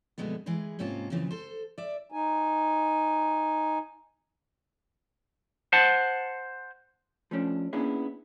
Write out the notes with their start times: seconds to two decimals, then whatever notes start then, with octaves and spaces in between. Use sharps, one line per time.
0.18 F2 B2 D3 G#3 A3 B3
0.46 E3 G#3 G#4 B4
0.79 G#2 C3 A#3 C#4 F4 A5
1.10 F2 A#2 C#3 E3 F3
1.31 A4 C5
1.78 D5 E5
2.12 D#4 G#5
5.73 C5 F#5 A5
7.31 F3 A3 C#4 D4
7.73 A#3 B3 C#4 D4 E4 G#4